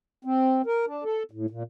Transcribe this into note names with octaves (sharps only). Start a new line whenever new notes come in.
C4
A#4
D4
A4
A2
A#2